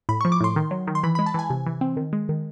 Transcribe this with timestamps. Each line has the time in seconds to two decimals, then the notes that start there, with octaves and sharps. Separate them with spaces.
0.09 A2 B5
0.21 F3 C#6
0.32 D6
0.40 A2 C6
0.56 D#3
0.71 F#3
0.87 D#3
0.95 C6
1.03 E3 B5
1.15 G#3 B5
1.26 A5
1.34 E3 G#5
1.50 C3
1.67 E3
1.81 C4
1.97 D#3
2.13 G#3
2.29 D#3